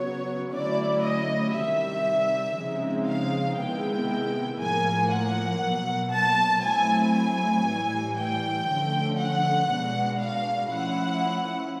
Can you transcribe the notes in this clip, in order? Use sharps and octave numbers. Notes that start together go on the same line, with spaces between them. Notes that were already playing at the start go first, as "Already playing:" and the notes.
Already playing: C#3 F#3 B3 C#5
D3 F#3 A3 C#4 E4 D5
D#5
C3 D#3 G3 E5
C#3 F3 G#3 C4 D#4
F5
C3 D#3 G#3 B3 E4 G5
A2 F3 A#3 G#5
F#5
B2 F#3 A#3
A5
F#3 A3 C4 E4 G#5
G#5
A2 E3 G3
G5
D3 F3 A3 C#4
F#5
B2 G#3 B3 D4
F5
F3 A3 C#4 E4 F#5